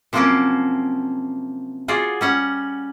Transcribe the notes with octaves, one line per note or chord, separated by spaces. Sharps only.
C3 F3 F#3 A#3 C4 C#4
F4 F#4 G#4 C#5 D5
G3 C#4 F#5